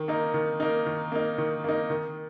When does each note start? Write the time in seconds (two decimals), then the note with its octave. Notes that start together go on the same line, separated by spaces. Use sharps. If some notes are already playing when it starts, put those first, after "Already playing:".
Already playing: D#3
0.08 A#3 D#4
0.34 D#3
0.60 A#3 D#4
0.86 D#3
1.12 A#3 D#4
1.38 D#3
1.64 A#3 D#4
1.90 D#3